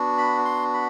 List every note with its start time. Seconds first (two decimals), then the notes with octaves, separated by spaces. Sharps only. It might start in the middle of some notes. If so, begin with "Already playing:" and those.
Already playing: B3 D4 F#4
0.18 B5
0.45 C6
0.74 B5